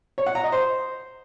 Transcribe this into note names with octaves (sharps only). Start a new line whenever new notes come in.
C#5
F#5
A#5
D#5
C5